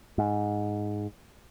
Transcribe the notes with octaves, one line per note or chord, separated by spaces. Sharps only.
G#2